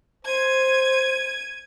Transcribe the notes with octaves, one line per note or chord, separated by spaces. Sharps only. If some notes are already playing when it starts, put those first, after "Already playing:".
C5 G#6 D#7